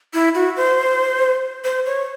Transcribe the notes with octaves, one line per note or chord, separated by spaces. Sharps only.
E4
F#4
C5
C5
C#5